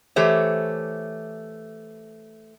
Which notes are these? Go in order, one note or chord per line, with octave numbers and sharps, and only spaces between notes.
E3 A3 G4 C5 C#5